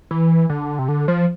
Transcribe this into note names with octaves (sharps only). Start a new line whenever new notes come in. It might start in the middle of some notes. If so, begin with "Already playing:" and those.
E3
D3
C3
D3
F3